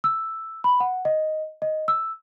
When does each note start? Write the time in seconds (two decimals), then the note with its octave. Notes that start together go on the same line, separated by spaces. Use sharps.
0.04 E6
0.64 B5
0.80 F#5
1.05 D#5
1.62 D#5
1.88 E6